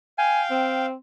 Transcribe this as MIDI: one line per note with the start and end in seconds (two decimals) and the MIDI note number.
0.18 0.86 77
0.18 0.86 79
0.18 0.42 80
0.51 0.94 60